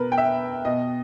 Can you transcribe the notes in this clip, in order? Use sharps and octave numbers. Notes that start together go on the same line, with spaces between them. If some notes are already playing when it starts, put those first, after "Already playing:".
Already playing: B2 A#4 B4
G5
E5
B2 D#5